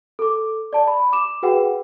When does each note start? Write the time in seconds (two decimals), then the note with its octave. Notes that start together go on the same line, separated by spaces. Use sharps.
0.19 A4 D6
0.73 D5 A5
0.88 B5
1.13 D6 E7
1.43 F#4 G#4 B4 F#5 G5